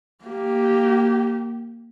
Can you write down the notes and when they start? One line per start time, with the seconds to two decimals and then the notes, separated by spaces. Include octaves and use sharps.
0.25 A#3 G4